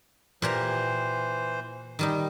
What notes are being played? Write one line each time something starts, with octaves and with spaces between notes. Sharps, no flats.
A#2 E3 G4 C5 A#5
D#3 G3 D#4